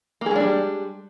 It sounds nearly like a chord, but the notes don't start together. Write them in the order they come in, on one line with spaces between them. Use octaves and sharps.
A#3 G#4 G#3 D4 G3